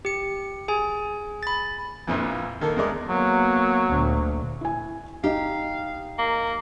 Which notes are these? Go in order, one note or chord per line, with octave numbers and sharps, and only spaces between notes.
G4 C#7
G#4 G#5
B5 A6
A#1 F2 A#2 E3
D#3 A#3 A4
E2 G#3 A#4 D5
F#3 A#3 B3
D2 A#2
E4 G#5
D#4 G4 D#5 F5
A#3